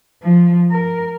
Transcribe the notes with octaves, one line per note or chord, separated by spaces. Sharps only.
F3
A#4